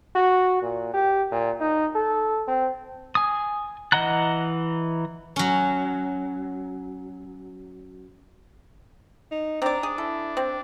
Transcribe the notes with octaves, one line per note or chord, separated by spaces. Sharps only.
F#4
A#2
G4
A#2
D#4
A4
C4
G#5 D#6
E3 D#5 F#5 A#5 F#6
F#3 C#4
D#4
C4 D4 D5 A#5
G#4
E4 A4
C4